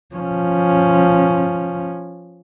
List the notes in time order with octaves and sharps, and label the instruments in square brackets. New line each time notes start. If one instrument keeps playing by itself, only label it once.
[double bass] F3 C#4